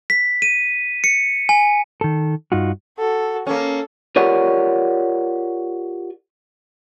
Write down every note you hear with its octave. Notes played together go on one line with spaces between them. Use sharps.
B6
D#7
C#7
G#5
D#3 A4
G2 D#4 F4 F#4
F#4 A4
A#3 C#4 A4
F4 G4 A#4 C#5 D5 F#5